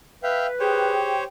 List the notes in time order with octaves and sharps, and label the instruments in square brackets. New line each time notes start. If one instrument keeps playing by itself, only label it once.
[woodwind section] B4 [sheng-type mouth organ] E5 F5 G5
[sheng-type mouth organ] G4 C5 C#5 [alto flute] G#4 [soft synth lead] G5